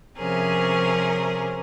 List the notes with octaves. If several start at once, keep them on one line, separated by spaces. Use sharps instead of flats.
C3 F3 C#4 G#4 A#4